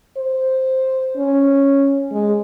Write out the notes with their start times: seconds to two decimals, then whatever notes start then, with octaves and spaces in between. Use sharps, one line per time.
0.17 C5
1.17 C#4
2.12 G#3